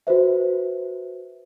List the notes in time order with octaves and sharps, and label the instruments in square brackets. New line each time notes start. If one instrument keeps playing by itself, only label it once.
[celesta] F#4 B4 C5 E5